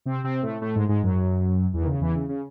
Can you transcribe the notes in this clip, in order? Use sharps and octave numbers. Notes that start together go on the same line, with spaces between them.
C3 C4
C3 C4
A2 A3
A2 A3
G#2 G#3
G#2 G#3
F#2 F#3
E2 E3
D#3
C#3
E2 E3
C#3
C#3